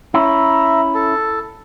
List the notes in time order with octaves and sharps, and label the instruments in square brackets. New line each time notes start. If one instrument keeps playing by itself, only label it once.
[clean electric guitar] C#4 E4 [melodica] E5 A#5
[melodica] A4